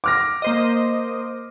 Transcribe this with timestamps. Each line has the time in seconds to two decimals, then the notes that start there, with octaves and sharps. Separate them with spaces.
0.04 D6 F6 A#6
0.42 A#3 C5 D#5